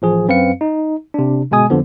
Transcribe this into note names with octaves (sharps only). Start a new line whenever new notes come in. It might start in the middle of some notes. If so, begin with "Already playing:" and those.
A1 F3 G#4
F#2 C4 B4 F5 C#7
D#4
C3 D4
G1 B2 G#3 G#5 D#6
F2 D3 F3 B3